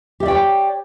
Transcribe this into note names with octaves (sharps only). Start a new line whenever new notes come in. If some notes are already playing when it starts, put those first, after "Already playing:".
G4 C#5 D5 E5 G5